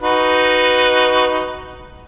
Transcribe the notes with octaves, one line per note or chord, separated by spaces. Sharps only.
D#4 F#4 B4